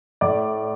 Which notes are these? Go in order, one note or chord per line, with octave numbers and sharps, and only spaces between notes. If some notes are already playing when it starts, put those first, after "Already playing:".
A2 D5